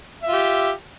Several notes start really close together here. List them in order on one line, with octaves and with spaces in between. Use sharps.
E5 F4 G4